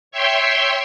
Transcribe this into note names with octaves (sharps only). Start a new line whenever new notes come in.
C#5 E5 G5 C6